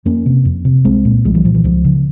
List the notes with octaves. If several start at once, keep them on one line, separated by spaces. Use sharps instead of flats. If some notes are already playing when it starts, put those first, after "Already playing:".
F2 A#3 C#4
C3
F2
C3
C2 G#3 C4
A#2
C2 F3 G#3
E3 G3
A#2 F3
E3
C#2 F3
C#3